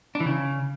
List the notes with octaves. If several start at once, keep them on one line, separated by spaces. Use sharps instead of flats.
D4
E3
C#3